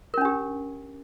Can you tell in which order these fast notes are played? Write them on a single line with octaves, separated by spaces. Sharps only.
A#4 C#4 D4 G4